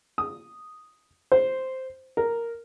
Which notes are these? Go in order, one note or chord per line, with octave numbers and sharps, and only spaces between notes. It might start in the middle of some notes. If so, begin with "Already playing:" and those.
D#6
C5
A#4